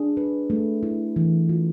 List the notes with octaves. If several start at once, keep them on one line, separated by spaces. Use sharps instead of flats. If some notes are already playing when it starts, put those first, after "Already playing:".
Already playing: D4 G#4
B4
A3
E4
E3
F4